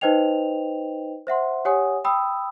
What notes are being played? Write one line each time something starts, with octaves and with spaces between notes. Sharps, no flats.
D#4 B4 C5 D#5 G5 F7
C5 E5 F#5 C6
G4 C#5 F#5 G#5 D#6
G5 B5 D#6 E6